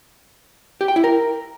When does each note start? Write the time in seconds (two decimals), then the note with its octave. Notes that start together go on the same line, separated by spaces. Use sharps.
0.81 G4
0.88 G5
0.96 E4
1.04 A#4